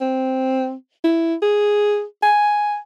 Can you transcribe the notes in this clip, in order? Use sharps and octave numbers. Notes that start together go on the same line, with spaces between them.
C4
E4
G#4
G#5